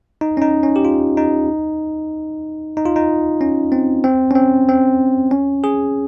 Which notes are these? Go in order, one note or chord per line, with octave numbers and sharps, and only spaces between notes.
D#4
C#4
D#4
C#4
G4
F4
D#4
D#4
F4
D#4
C#4
C4
C4
C#4
C4
C4
C#4
G#4